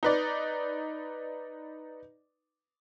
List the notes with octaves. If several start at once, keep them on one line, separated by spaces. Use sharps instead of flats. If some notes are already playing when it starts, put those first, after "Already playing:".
D#4 B4 D5